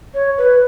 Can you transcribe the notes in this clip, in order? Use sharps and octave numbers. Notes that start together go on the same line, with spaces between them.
C#5
B4